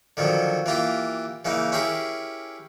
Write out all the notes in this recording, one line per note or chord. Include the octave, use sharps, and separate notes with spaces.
D3 D#3 F3 F#3
E3 A#3 F4 G4
C#3 E3 A#3 D#4
C#4 E4 G4 G#4 A#4